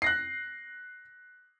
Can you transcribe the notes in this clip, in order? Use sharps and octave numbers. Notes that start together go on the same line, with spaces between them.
F#6 A#6 C7